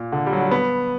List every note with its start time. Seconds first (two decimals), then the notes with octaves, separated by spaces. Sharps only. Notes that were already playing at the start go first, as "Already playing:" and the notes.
Already playing: A#2
0.12 D3
0.27 G3
0.32 F#3
0.41 G3
0.51 B3